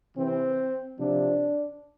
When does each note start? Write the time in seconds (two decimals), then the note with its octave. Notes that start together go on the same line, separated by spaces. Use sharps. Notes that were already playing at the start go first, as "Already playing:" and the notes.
0.15 C3 E3 C4
0.98 C3 F3 D4